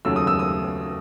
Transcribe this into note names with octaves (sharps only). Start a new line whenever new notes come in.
D#2 C#3 F#3 A3 E6
D#6
E6
D#6